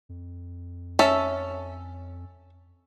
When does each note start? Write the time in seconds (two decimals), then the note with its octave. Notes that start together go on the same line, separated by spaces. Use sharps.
0.09 F2
0.99 C#4 A4 E5